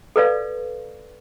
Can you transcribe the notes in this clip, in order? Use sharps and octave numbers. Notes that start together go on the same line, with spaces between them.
A4 B4 D5 F5